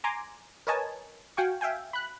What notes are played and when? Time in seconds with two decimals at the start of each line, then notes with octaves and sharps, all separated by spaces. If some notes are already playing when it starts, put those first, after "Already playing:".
0.04 G#5 A#5 C6 D6
0.67 A#4 B4 C#5 D#5 G#5 A5
1.37 F#4 F5 G5 G#5 C#6
1.61 E5 F5 G5 G#5
1.93 B5 F#6